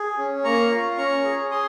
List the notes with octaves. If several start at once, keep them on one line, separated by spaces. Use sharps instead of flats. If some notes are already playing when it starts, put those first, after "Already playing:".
Already playing: G#4
C#4
A#3 A#5 C#6
F4
C#4 A#5 C#6
G#4
G#4 C6 D#6